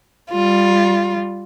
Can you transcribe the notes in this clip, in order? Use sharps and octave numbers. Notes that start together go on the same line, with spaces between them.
G3 F4